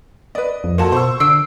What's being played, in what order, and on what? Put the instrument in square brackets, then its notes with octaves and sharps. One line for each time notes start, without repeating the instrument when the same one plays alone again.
[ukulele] B4 D5 [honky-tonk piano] D#5
[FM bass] F2
[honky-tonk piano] A#3 F#4 A4 [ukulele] F4 A5
[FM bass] B2 [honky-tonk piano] C5 C#6 E6
[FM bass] D3 [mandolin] E6 [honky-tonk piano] C7 D7